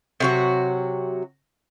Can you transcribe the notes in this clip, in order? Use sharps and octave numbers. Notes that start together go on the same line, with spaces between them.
C3 F#3 F#4